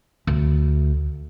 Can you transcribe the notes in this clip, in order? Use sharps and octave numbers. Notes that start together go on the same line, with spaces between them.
D2